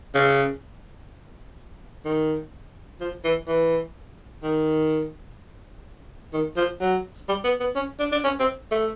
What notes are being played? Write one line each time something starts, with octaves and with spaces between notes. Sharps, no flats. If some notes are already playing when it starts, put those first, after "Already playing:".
C#3
D#3
F3
E3
E3
D#3
D#3
F3
F#3
G3
B3
B3
C#4
D4
D4
C#4
C4
A3